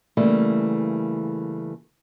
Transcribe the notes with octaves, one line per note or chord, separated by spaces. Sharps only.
C#3 E3 G3 A3 A#3